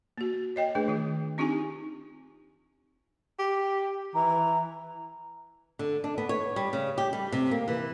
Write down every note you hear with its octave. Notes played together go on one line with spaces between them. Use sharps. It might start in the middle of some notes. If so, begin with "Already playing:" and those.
A#3 F#4
C#5 D#5 G5
A3 D4 G#4 B4
D#3 F4
C4 D4 D#4 F4 G4 G#5
G4
E3 A#5
D3
D4
B3
C#5
G3
C#3
G4
G3
C3
A#3
E3